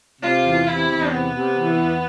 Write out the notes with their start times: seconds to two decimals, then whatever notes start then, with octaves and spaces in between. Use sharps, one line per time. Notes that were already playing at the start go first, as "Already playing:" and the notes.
0.22 C3 F4
0.44 E2
0.67 C3 E4
0.89 E2
1.11 C3 B3
1.33 C3
1.56 E3
1.77 E2